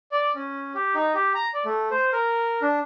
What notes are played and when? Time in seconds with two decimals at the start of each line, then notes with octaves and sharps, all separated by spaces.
0.12 D5
0.35 C#4
0.75 G4
0.95 D#4
1.15 G4
1.35 A#5
1.54 D5
1.65 A3
1.91 C5
2.13 A#4
2.62 D4